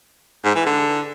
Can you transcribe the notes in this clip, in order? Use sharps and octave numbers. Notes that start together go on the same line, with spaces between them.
G#2
E3
D3